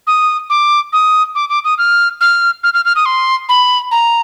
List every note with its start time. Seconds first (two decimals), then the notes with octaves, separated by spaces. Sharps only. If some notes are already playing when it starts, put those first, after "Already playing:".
0.07 D#6
0.50 D6
0.93 D#6
1.35 D6
1.49 D6
1.64 D#6
1.78 F6
2.21 F6
2.63 F6
2.74 F6
2.85 F6
2.96 D#6
3.06 C6
3.49 B5
3.91 A#5